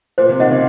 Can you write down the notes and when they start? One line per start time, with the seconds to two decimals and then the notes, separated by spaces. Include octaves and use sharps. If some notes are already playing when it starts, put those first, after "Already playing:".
0.18 A#2 C5
0.29 C3
0.40 D#3 D#5 F#5
0.51 C#3